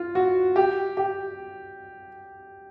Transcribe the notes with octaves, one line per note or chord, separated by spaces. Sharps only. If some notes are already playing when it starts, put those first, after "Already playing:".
Already playing: F4
F#4
G4
G4